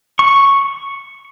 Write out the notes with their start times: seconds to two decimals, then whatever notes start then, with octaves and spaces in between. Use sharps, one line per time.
0.19 C#6